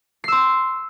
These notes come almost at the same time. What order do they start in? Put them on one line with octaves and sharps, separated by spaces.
C7 E6 C6